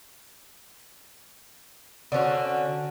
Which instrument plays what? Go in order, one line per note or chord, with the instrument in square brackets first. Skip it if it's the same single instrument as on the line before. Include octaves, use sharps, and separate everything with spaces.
[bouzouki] D3 C4 C#4 F#4